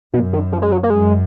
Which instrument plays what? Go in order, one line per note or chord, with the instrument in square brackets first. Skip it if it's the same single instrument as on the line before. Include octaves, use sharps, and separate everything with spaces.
[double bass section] F#2 [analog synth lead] B2
[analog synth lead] D#3
F3
G#3
F#3
A#3
[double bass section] F#2 [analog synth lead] G#3